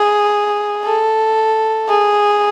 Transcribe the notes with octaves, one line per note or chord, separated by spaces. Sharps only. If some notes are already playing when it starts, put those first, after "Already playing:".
Already playing: G#4
A4
G#4